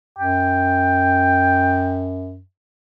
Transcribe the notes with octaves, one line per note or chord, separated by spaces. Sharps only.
F#2 G5